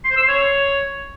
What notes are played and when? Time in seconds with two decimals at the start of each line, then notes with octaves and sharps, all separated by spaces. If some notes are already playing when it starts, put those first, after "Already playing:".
0.05 C6
0.11 C5
0.17 E6
0.23 C6
0.29 C#5